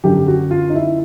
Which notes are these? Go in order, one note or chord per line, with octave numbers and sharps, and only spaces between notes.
F#2 D3 F#3 G4
F#4
F4
D#4
E4